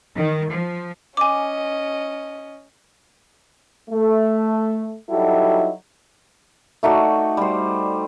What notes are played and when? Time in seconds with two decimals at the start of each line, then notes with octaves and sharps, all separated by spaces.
0.15 D#3
0.50 F3
1.17 C#4 D#5 G#5 D6
3.90 A3
5.09 F#3 G3 D#4 E4 F#4 A4
6.83 A3 D#4 F#4 D5
7.37 G3 C5